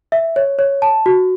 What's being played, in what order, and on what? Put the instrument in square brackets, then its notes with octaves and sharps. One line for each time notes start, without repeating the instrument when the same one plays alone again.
[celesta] E5
C#5
C#5
A5
F#4